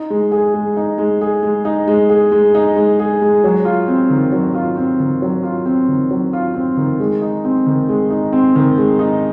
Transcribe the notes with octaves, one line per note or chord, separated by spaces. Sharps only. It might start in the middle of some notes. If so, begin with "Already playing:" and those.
Already playing: D#4
G#3
G#4
G#3
D#4
G#3
G#4
G#3
D#4
G#3
G#4
G#3
D#4
G#3
G#4
G#3
F#3
F4
C4
D#3
F#3
F4
C4
D#3
F#3
F4
C4
D#3
F#3
F4
C4
D#3
G#3
D#4
C4
D#3
G#3
D#4
C4
D#3
G#3
D#4